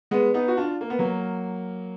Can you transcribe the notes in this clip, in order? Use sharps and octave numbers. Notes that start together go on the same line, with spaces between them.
G#3 B3
B3 D#4
F#4
D4 F4
A#3
B3
F#3 A#3